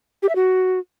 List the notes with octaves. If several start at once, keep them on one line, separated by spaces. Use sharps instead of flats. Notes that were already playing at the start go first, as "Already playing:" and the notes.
G4
E5
F#4